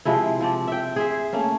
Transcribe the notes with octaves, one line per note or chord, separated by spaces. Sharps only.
C3 F3 G#3 E4
F3 C4 D5
E5 G5
G#4 C5 E5
A3 A#3 C#4